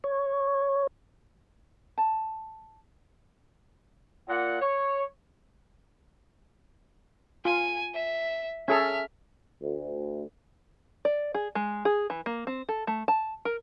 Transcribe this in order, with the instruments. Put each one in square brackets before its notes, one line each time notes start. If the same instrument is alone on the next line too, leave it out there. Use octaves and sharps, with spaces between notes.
[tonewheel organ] C#5
[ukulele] A5
[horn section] A#2 F#5
C#5
[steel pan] F4 [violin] G#5
[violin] E5
[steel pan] C#4 G#4 A4 [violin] E5 F6
[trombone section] D2
[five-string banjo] D5
G#4
G#3
G#4
E3
A#3
C4
A4
A3
A5
A#4